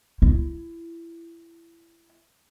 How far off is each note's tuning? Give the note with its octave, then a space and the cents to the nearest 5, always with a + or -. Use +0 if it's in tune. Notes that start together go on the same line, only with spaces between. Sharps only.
E4 +25